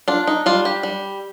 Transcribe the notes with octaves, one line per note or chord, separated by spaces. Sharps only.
D4 F4
D#4
G3 F4
G4
G3